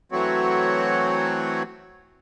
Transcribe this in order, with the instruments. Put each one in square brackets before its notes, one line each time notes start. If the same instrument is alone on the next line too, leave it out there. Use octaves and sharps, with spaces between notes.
[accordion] E3 F#3 A3 C4 F#4 C#5